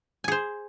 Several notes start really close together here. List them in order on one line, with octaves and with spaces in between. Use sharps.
G#5 G#4 C5